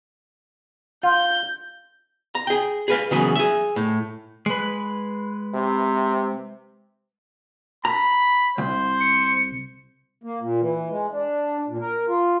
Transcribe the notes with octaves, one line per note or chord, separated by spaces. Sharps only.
F4 G6
A#5
G#4 G5
G#4 B4 F5
C#3 E3 F#3 A#3 B3 G#4
G#4 E5
A2
G#3 B4
C3
A#5 B5
C2 C5
C#7
A#3
A#2
E3
G#3
D4
A#2
A#4
F4